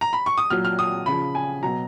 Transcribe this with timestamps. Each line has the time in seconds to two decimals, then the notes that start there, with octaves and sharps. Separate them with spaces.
0.01 A#5
0.13 B5
0.26 C#6
0.38 D#6
0.50 A#2 F#3 F6
0.65 F6
0.79 D#6
1.06 C#3 F3 B5
1.35 G#5
1.63 B2 F#3 A#5